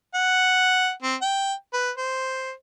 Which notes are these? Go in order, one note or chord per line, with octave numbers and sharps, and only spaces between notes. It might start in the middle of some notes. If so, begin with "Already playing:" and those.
F#5
C4
G5
B4
C5